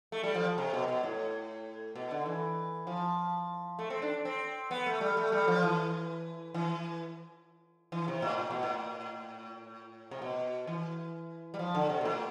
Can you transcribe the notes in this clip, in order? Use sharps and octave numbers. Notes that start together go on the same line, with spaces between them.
A3
G3
F3
C3
B2
B2
A2
B2
D3
E3
F3
A3
C4
D4
C4
B3
A3
G3
A3
G3
F3
E3
E3
E3
C3
A2
A2
B2
A2
C3
B2
E3
G3
F3
D3
C3
B2
A2